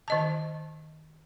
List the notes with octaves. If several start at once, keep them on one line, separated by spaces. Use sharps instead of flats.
D#3 D#5 A5